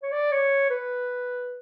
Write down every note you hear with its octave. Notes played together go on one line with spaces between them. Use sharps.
C#5
D5
C#5
B4